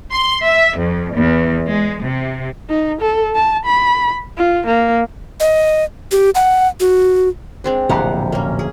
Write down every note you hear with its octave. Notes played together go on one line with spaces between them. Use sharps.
C6
E5
F2
E2
G#3
C3
D#4
A4
A5
B5
F4
A#3
D#5
G4
F#5
F#4
G#3 C4 D4
D1 A#1 C3 G4 F5 F#5
A#3 C#4
G#4